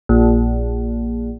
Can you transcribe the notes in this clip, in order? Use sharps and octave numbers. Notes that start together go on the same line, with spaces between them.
A#1